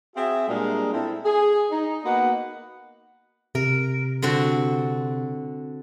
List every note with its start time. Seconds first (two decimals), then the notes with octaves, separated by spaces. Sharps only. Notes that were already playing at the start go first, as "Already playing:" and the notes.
0.15 C4 F#4 G#4 E5
0.47 A#2 G3 G#3 D4 G#4 A#4
0.93 C4 E4 A4
1.24 G#4
1.70 D#4
2.03 A#3 B3 D#4 F#4 F#5 B5
3.55 C3 A#4
4.22 D3 C4 F#4